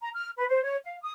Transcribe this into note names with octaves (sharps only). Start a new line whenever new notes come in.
A#5
F6
B4
C5
C#5
F5
D#6